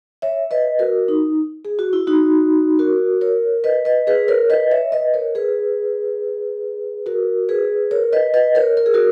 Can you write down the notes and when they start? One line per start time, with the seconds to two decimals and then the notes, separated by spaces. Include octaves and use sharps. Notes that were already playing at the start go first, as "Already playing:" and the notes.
0.22 C#5 E5
0.51 B4 D#5
0.79 F#4 A#4
1.08 D#4
1.65 G#4
1.79 F#4
1.93 E4
2.07 D#4 F#4
2.79 F#4 A#4
3.21 A#4 C#5
3.64 B4 D#5
3.85 B4 D#5
4.07 G#4 B4
4.28 A#4 C#5
4.50 B4 D#5
4.71 C#5 E5
4.92 B4 D#5
5.14 A#4 C#5
5.35 G#4 B4
7.06 F#4 A#4
7.49 G#4 B4
7.91 A#4 C#5
8.13 B4 D#5
8.34 B4 D#5
8.55 A#4 C#5
8.77 A#4
8.86 G#4
8.94 F#4 A#4